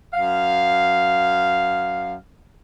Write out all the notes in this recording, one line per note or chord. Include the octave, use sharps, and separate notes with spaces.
F#2 F5